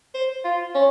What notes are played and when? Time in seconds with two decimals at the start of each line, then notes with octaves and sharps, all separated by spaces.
0.15 C5
0.44 F4
0.75 C#4